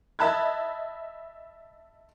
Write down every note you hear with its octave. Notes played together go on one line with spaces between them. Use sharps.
D#5 E5 A5 B5 F#6 G#6